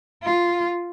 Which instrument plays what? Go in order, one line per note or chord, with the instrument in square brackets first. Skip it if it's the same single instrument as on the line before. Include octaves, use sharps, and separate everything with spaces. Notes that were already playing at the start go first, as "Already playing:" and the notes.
[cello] F4